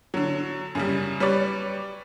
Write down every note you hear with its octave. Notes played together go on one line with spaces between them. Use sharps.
D3 F#3
F#2 C#3 G3
G3 B4 C#5 D5